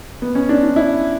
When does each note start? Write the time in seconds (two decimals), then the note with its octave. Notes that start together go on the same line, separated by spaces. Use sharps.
0.22 B3
0.35 C#4
0.49 D4
0.63 D4
0.76 E4